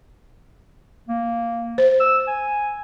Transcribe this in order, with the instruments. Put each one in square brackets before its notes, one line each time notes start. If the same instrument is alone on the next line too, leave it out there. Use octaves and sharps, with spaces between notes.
[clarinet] A#3
[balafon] C5
[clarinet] E6
G#5